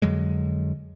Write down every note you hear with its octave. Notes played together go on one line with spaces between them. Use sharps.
F2 D3 F#3 G#3